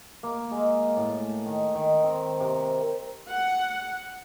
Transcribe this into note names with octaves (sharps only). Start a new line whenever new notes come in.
A#3
G#3
A2
D#3
D#3
C4
C3
F#5